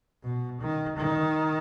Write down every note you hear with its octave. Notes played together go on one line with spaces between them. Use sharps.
B2
D#3
D#3